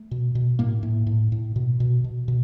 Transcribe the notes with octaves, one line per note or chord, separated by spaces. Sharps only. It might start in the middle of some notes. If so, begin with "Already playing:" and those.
Already playing: A3
B2
B2
A2 A#3
A2
A2
A2
B2
B2
B2
B2